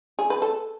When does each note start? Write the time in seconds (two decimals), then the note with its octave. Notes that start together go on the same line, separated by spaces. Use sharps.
0.19 G#4
0.30 B4
0.42 A4